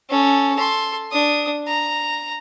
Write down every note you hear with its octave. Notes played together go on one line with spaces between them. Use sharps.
C#4 A4
A4 C6
D4 D#6
A#5